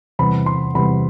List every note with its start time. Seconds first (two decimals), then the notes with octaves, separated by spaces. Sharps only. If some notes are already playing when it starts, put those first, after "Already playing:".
0.19 E2 C3 G3 B5
0.46 C6
0.75 E2 C3 G3 B5